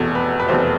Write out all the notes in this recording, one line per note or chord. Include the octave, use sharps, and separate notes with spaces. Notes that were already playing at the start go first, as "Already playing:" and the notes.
Already playing: F1 E2 B2 A4
B4
B4
F1 E2 B2 C5